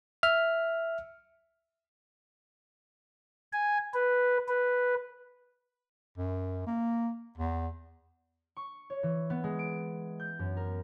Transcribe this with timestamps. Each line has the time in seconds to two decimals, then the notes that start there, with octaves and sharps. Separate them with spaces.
0.23 E5 F6
3.53 G#5
3.94 B4
4.48 B4
6.18 F#2
6.67 A#3
7.37 E2
8.57 C#6
8.90 C#5
9.03 E3
9.30 B3
9.44 G#3
9.59 D7
10.20 G6
10.39 F#2
10.57 A#4